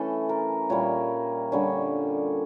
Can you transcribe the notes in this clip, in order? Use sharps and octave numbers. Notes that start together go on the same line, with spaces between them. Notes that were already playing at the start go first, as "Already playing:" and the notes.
Already playing: E3 A3 C#4 A4
A#4
A#2 G3 A#3 C#5
D3 G3 C#4 C#5